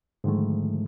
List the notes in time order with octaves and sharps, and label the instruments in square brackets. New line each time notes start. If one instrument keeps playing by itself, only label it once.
[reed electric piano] G#2 D3 D#3 F3 G#3 A3